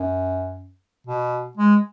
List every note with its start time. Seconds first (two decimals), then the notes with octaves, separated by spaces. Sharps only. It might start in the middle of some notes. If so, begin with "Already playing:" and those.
Already playing: F#2
1.07 B2
1.57 G#3